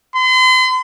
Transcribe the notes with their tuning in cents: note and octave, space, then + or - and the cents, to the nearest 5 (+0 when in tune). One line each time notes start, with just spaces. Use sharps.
C6 -40